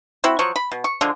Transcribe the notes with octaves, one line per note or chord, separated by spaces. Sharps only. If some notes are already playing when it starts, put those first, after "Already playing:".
C4 E4 F#4
F3 F#3 C#6
B5
B2
C#6
D3 F3 G#3